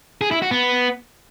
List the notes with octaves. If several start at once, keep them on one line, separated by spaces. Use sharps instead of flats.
G#4
E4
F#4
B3